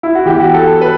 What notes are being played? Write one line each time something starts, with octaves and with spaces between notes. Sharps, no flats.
E4
F#4
E3 B3 G4
F#4
A4
B4